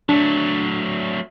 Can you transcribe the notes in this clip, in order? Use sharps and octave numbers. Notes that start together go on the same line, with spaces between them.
F#3 A3 D4